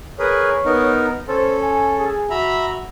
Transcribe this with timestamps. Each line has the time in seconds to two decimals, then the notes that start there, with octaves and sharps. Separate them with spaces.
0.19 G#4 A#4 B4 C#5
0.65 B3 D#4 A#4
1.28 C#4 A4 C5
1.62 G#5
1.98 G#4
2.30 F#4 E5 A#5 B5